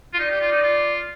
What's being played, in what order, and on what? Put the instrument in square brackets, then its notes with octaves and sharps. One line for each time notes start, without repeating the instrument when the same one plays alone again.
[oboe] F4
[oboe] D#4 [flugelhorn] D5
[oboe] G4
F4
D#4
F4